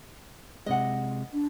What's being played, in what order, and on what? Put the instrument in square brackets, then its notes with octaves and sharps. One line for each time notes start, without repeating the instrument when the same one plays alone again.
[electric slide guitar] C3 G#3 [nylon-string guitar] D#5 F#5
[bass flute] D4